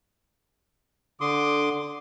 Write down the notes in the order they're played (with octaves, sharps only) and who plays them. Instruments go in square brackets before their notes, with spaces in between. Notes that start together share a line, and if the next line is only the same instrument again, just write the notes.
[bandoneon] D3 C6 D#6 [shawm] D6